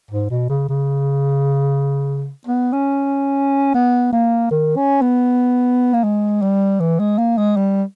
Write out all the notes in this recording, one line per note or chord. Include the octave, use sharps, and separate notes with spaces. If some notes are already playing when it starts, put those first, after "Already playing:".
G#2
B2
C#3
C#3
B3
C#4
B3
A#3
D#3
C#4
B3
A#3
G#3
G3
E3
G#3
A#3
G#3
G3